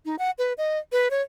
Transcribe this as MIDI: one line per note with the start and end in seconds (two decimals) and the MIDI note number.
0.05 0.16 63
0.19 0.31 78
0.38 0.53 71
0.58 0.79 75
0.92 1.08 71
1.11 1.22 73